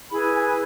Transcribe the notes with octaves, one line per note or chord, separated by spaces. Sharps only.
E4 G#4 B4 B5
G#5